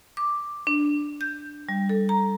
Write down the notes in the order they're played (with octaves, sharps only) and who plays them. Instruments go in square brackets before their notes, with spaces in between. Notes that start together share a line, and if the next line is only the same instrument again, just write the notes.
[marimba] D6
D4
G6
G3
A4
A#5